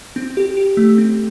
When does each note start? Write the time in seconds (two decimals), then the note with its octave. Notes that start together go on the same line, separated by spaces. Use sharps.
0.16 C4
0.37 G4
0.57 G4
0.77 A3
0.98 C4